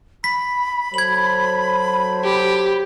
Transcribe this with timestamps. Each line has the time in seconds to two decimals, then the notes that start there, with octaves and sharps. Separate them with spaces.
0.24 B5 B6
0.94 F#3 A4 C5 G#6 F#7
2.24 G4